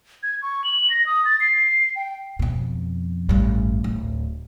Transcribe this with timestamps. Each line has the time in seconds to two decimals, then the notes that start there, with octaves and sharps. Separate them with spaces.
0.23 G#6
0.42 C#6
0.64 F#7
0.90 A#6
1.06 D#6
1.25 A6
1.40 C7
1.96 G5
2.39 F2 B2
3.29 A1 G2
3.84 D1